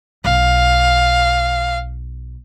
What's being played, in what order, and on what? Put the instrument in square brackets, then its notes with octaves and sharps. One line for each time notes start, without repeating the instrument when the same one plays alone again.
[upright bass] B1 [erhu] F5